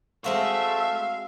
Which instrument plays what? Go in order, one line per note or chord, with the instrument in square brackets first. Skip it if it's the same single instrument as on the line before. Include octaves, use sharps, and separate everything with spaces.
[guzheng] G#3 C4 F#4 [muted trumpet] A3 [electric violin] E5 [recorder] F5